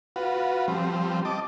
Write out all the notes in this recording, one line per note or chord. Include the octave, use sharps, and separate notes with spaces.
F4 F#4 B4
F3 G3 C4
D#5 A5 D6